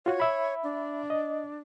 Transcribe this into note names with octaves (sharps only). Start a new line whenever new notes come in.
F4 F#4 C#5
E5 B5
D4
D#5